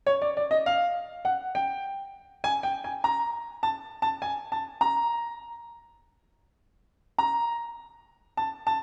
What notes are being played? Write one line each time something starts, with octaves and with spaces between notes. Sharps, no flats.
C#5
D5
D5
D#5
F5
F#5
G5
G#5
G5
G#5
A#5
A5
A5
G#5
A5
A#5
A#5
A5
A5